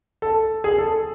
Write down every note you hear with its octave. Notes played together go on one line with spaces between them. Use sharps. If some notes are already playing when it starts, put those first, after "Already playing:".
A4
G#4
A4